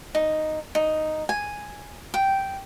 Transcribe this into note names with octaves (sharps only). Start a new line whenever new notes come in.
D#4
D#4
G#5
G5